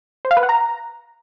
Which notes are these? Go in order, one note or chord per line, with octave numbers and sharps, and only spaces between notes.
C5
F5
B4
F#5
A#5